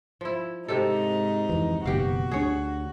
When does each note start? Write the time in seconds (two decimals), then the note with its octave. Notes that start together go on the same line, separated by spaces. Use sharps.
0.21 F3 E4
0.68 G#2 C3 D#4 G4 A4
1.49 F2 E3
1.86 F#1 B2 D#3 F#4 G4 F5
2.31 D2 D4 G#4 C#5